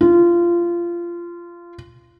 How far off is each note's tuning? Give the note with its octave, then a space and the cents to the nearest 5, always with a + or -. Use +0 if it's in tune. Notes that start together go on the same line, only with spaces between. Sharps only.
F4 -20